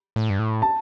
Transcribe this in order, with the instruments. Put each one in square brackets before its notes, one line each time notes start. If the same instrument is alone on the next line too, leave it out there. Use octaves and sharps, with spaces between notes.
[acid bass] A2
G2
A2
[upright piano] A5